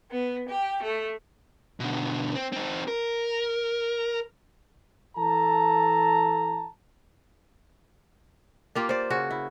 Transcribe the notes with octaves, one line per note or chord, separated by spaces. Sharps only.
B3
G4
A3
B2 D3
C4
C4 D#4
A#4
E3 A4 A5 A#5
A#3 F4 G4
C5 D5
C#3 F#4
E4